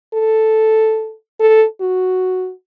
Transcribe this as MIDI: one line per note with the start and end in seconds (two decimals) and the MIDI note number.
0.14 1.13 69
1.40 1.65 69
1.81 2.51 66